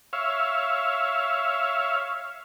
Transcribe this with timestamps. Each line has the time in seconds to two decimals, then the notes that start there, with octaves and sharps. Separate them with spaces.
0.13 C#5 E5 F5